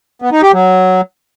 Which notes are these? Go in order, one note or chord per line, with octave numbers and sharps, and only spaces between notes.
B3
D#4
G4
F#3